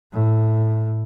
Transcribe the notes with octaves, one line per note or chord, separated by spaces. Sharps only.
A2